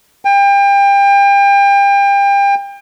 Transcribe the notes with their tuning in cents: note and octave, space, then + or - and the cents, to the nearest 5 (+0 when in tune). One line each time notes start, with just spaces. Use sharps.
G5 +30